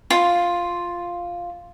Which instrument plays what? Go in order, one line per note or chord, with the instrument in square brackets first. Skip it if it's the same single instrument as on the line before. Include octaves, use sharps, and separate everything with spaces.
[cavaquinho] F4